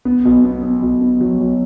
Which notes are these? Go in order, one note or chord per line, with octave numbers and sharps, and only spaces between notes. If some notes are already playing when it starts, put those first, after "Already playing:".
B3
B1
B3
B3
B1
B3
F#3
B1